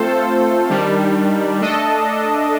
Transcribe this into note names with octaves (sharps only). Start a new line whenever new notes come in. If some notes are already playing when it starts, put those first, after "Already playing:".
Already playing: A3 C4 F4 A4 C5
D#3 G3 D4
A3 D4 A4 D#5